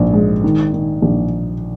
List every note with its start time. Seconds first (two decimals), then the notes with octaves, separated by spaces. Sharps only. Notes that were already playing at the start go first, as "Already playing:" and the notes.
Already playing: A#1 G#2
0.14 G#3
0.44 D#3
0.73 D#3
1.02 A#1